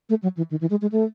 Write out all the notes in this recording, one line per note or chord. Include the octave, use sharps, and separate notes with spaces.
A3
F#3
E3
D#3
E3
G#3
G#3
A3